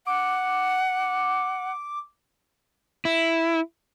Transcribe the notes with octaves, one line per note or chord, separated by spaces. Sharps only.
F#5 D6
E4